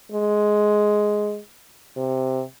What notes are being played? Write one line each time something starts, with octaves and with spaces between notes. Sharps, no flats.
G#3
C3